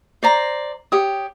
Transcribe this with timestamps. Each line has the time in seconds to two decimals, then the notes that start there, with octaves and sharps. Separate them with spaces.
0.23 C5 D5 A#5
0.92 G4 C#5 D#6